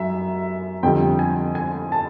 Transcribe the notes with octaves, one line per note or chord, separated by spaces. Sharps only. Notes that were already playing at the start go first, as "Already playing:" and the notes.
Already playing: F#2 F#3 E5
F2 D3 G3 G5
G#5
G#5
A5